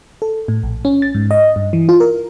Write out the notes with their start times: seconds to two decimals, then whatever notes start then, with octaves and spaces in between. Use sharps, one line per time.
0.22 A4
0.48 A2
0.63 A#1
0.85 C#4
1.02 A6
1.15 G#2
1.31 D#5
1.56 G2
1.73 E3
1.89 F4
2.00 A#4